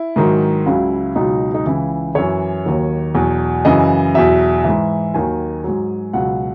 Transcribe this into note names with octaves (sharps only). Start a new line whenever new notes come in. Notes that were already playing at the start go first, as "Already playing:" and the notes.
Already playing: E4
G#2 D#3 F#3
C#2 C#3 F#3
C#2 B2 F#3 D#4
D#4
C#2 C#3 E3 E4
F#2 E3 C#5
D#2 D#3 F#3
E2 B2 F#3
F#2 C#3 E3 D#5
E2 B2 F#3 E5
G#2 E3 E5
D#2 D#3 F#3 G#5
G#2 F#3
C#2 B2 F#3 F#5